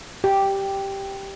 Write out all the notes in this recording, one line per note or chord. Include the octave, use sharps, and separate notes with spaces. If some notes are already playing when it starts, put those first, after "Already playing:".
G4